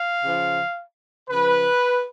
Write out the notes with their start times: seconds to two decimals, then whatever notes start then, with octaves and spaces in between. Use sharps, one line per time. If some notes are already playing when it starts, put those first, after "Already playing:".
Already playing: F5
0.24 C#3 F3
1.30 C#3 F3 B4